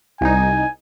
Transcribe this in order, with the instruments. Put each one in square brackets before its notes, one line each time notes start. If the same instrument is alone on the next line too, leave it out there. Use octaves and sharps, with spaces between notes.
[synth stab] C2 D#4 [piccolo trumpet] G#5